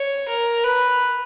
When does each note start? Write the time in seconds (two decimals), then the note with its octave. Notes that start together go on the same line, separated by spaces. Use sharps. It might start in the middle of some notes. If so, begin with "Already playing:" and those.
Already playing: C#5
0.29 A#4
0.64 B4